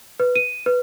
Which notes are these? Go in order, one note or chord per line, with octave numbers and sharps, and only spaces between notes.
B4
D#7
B4